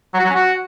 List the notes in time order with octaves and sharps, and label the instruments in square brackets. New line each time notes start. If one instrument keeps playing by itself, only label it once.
[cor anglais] F#3
F#4
F#3
C#4
F#4